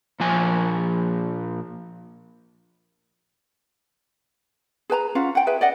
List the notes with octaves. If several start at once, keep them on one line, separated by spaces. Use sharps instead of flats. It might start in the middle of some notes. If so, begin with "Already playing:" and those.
A#2 F3 G#5
G#4 B4 A5 A#5
C#4 F4 F5 F#5
F#5 G5
G#4 B4 E5
D5 D#5 F#5